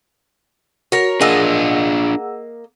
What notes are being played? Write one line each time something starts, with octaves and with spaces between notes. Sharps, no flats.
F#4 A#4 C#5
A#3 D4 F4 G#4 D#5 F#5 E6